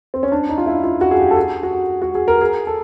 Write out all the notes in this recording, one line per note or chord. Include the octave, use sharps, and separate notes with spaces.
C4
C#4
D4
D#4
F4
E4
F4
F#4
G#4
G4
A4
G#4
F#4
F#4
G#4
A#4
G#4
A4